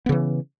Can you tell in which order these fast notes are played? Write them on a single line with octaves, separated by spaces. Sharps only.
B3 C#3 E3